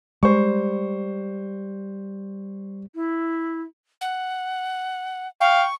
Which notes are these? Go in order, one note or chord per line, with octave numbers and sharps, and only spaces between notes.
G3 G#3 C5 C#6
E4
F#5
F5 G5 C#6